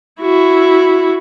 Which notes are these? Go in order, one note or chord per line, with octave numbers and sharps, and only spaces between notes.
E4 F#4